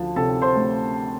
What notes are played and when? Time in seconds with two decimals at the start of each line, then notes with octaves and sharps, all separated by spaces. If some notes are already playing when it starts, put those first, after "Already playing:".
Already playing: D2 F3 A5
0.16 C3 A4 A5
0.42 C5 C6
0.56 A3